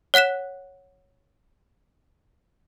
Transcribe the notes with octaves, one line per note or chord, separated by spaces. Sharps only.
C#5 F#5 F#6 B6 E7